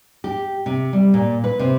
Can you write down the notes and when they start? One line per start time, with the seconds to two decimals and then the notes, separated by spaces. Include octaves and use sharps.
0.24 G4
0.66 C3
0.93 G3
1.14 A#2
1.44 B4
1.59 C3